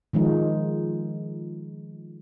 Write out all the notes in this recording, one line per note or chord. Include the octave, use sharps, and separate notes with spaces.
D#3 F3 G#3 D#4